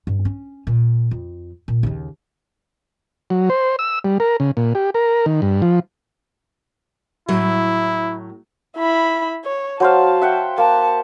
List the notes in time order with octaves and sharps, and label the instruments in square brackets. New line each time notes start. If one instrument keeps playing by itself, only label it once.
[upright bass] G2
C#4
A#2
F2
A#2
D#2 C#3
[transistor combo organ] F#3
C5
E6
G3
A#4
C#3
A#2
G4
A#4
D#3
G2
F3
[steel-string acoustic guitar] A2 F#3 [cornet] E4
[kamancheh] E4 B5
C#5
[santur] F#3 C5 F5 [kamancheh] A5
[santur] E5 F#5 G5
[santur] A#3 [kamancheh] A5